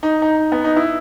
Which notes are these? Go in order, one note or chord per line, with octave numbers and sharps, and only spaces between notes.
D#4
D#4
B3
D#4
E4